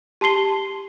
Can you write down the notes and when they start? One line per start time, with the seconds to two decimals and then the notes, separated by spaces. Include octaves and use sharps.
0.21 G4 A5 C6 C7 G7